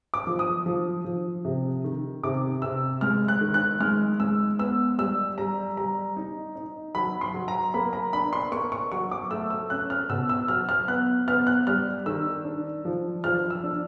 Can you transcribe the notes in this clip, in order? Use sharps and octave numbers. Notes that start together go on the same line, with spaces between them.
D6
F3
D#6
F3
F3
C3
D#3
C3 D6
C3 E6
G#3 F6
F#6
D#3
F#6
G#3 F6
G#3 E6
B3 E6
G3 E6
G3 A#5
G3 A#5
D#4
D#4
F#3 B5
C6
F#3
A#5
A#3 B5
A#5
D4 B5
C6
A#3 C#6
C#6
F#3 C#6
D6
A3 E6
E6
C#4 F#6
F6
B2 E6
E6
F#3 F6
F6
B3 F#6
B3 F6
F#6
G3 F6
D#3 E6
D4
F3
F3 F6
E6
D4